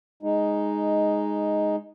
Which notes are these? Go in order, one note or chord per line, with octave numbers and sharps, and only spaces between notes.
G#3 D#4